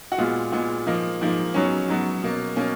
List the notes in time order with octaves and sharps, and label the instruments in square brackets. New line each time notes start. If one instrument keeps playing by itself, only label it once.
[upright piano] F#4
A#2 G#3 B3 F4
A#2 G#3 B3
G#2 F3 A#3 D#4
G#2 F3 A#3
G#2 F#3 B3 C#4
G#2 F#3 B3
B2 A#3
B2 A#3 C#4